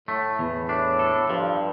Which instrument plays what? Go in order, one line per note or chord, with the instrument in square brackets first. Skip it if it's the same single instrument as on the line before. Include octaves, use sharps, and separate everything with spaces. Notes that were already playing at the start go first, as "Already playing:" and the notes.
[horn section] A2 [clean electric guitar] A3
[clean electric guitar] E2
[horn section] A2 [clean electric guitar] D4
[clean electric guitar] A4
[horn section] G2 [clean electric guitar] F3